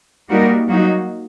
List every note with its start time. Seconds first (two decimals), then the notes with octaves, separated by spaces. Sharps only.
0.29 G3 A#3 D#4 F#4 A#4
0.68 F#3 A#3 D#4 F#4